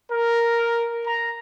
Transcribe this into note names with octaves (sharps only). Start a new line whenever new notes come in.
A#4
A#5